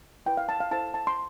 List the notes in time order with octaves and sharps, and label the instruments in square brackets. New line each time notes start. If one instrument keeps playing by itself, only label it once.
[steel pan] E4 B4 G5
F5
A5
F5
E4 A4 C5 A5
A5
C6